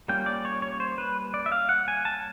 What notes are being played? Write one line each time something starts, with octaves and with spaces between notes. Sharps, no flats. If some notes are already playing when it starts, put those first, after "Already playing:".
G3 A#3 C#4 F4 G5
D5
C#5
C#5
C5
B4
D5
E5
F5
F#5
G#5
A5